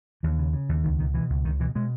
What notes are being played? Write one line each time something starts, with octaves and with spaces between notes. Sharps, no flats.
D#2 E3
C#3
C#3
D#2
C#2 D#3
B2 D#3
B2 E3
C#2
C#2 D#3
B2 E3
B2 G#3